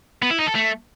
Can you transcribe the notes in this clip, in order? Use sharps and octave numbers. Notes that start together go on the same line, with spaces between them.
B3
E4
D#4
A4
A3